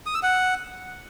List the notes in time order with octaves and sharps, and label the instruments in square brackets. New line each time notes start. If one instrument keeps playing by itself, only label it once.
[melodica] D#6
E6
F#5